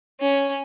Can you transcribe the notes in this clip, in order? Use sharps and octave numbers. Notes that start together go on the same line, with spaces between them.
C#4